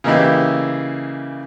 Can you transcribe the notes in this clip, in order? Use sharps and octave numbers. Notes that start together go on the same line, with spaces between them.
C#3 E3 A#3 D#4 E4 G4